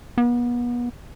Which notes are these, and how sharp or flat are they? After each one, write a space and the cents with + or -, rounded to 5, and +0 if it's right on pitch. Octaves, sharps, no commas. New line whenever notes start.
B3 -35